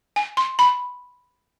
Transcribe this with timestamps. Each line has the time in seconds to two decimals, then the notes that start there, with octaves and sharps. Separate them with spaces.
0.16 G#5
0.37 C6
0.59 B5